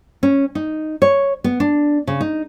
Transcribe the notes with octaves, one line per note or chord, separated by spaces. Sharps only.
C#4
D#4
C#5
B3
D4
C#3
D#4